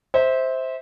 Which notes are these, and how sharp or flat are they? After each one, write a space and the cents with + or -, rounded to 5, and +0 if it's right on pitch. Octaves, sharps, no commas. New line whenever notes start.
C5 +0 E5 -25